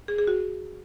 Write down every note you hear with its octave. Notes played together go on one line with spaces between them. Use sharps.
G#4
G#4
F#4